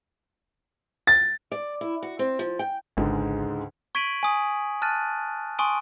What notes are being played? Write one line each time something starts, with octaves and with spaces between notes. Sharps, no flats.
A6
D5
E4
F#4
C4
F3
G5
G#1 C#2 G#2 D3
C#6 G#6 B6 D7 D#7 F#7
G#5 D#6
A5 F6 F#6 A6 D#7
G#5 C6 C#6 D#6 D7 D#7